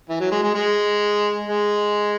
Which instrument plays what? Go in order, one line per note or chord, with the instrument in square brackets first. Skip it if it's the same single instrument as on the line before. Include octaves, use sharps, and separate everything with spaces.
[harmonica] E3
F#3
G#3
G#3
G#3
G#3